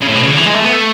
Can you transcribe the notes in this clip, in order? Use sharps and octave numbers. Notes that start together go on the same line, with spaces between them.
C#3
A2
B2
C#3
D3
E3
G#3
A3
B3
A3